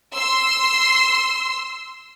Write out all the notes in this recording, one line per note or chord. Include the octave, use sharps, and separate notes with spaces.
C6 E6